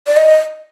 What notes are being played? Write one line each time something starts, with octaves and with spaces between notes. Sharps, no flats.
D5
D#5